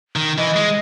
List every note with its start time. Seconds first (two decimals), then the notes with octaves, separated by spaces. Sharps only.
0.16 D#3
0.38 E3 D#5
0.56 G#3